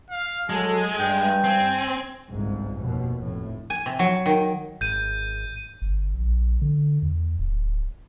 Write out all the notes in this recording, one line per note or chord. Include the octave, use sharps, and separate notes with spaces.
F5
F#3 G#3 A4 G#5
G2 G5
C4 G#5
G1 C2 G#2
F1 D#2 B2
F1 A2
G#5
C3
F#3
D#3
G#1 G6 D#7
G1
A#1
D3
E2
D1